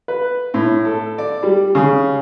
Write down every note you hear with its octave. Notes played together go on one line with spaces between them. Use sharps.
B4
A2
A4
D5
G3
C#3